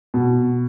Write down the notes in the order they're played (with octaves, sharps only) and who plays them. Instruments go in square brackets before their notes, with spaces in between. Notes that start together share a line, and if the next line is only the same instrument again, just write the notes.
[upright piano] B2